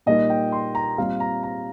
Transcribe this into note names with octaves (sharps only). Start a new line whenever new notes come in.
A#2 G3 A#3 D#4 D#5
G5
C6
A#5
A#2 G3 C4 F4 F5
A#5
A#5